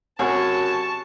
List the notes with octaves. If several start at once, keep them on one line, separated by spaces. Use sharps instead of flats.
F#2 C3 F#4 G#4 C#5 A5 C#6